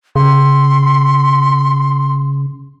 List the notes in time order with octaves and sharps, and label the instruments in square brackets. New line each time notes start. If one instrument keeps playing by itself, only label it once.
[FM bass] C#3 [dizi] C6